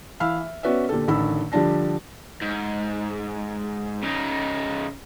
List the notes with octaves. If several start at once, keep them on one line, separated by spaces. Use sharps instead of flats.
E3 F5 B5 E6 F6
E5
B3 C#4 F#4 B4 D5 E5
A#2 D3 G4 A4
A1 D3 D#3 B5 E6
D3 F3 G3 D4 A5 A#6
G#2
C#3 D#4